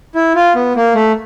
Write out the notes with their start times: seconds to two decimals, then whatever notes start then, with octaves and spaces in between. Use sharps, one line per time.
0.15 E4
0.35 F4
0.55 B3
0.76 A#3
0.95 A3